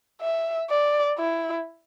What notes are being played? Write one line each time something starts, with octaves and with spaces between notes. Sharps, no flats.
E5
D5
E4